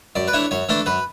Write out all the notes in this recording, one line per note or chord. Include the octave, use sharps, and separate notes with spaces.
F#2 D5
B4
E3 A3 D4 C#5
F#2 C#5
E3 A3 D4 A4
F#2 B4